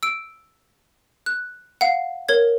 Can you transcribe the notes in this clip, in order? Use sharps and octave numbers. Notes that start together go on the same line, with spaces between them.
E6 D7
F#6
F5 F#5
A#4 C#5 G#6